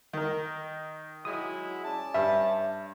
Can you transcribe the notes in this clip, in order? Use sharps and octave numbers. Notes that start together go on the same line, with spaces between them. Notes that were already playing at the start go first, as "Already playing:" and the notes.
D#3 A#4
F#3 G#3 E4 D#6
C#4 D5 A5
G2 E5